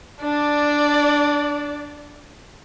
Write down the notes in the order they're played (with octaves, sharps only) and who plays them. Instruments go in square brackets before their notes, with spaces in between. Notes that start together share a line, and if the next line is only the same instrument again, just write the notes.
[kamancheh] D4 D5